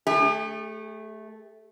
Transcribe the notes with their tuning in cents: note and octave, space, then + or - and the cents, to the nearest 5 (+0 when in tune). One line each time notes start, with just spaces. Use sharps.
A3 -10 G4 +45